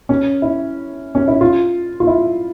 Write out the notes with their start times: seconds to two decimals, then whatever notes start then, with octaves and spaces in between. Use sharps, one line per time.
0.09 C#4
0.42 E4
1.15 C#4
1.28 E4
1.41 F4
2.00 F4
2.07 E4